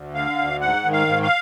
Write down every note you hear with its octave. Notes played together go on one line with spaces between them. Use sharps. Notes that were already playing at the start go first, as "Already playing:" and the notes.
Already playing: D2
D3 F5
D2
G#2 F#5
D#3
F5
G#2
F5